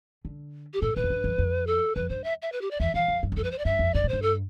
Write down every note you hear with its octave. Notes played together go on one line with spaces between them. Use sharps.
D3
G4
A2 A4
A2 B4
F2
G2
F2
F2
A4
F2 B4
G2 C5
E5
E5
B4
G4
D5
E2 E5
E2 F5
F2
G2
E2
F2 A4
B4
C5
D5
G2 E5
F2
G2 D5
A2
G2 C5
A4